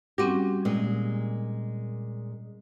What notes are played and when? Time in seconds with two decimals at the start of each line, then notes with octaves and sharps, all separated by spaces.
0.18 G3 C4 C#4 F#4 G4
0.65 A#2 G#3